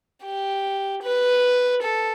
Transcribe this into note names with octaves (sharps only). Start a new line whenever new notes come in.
G4
B4
A4